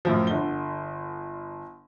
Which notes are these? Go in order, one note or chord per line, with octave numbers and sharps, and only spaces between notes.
F#2 A2 F3
G1 D3 G7